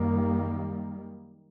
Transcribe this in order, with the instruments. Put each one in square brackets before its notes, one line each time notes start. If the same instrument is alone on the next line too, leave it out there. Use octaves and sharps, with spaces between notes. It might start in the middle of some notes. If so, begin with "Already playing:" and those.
Already playing: [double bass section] F#2 D#3 G3 A#3